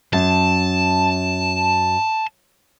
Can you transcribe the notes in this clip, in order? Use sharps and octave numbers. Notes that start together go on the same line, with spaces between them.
F#2 A5